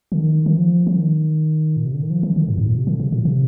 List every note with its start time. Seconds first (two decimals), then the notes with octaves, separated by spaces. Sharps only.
0.12 D3
0.19 D#3
0.46 D#3
0.57 F3
0.87 F3
0.96 D#3
1.77 A#2
1.85 C3
1.94 D3
2.02 D#3
2.10 F3
2.23 D#3
2.36 D3
2.49 G2
2.58 G#2
2.68 A#2
2.77 C3
2.87 D3
3.00 C3
3.12 A#2
3.25 C3